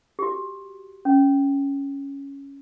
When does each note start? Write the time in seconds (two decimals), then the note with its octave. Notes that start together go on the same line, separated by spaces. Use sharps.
0.19 F#4 G4
1.05 C#4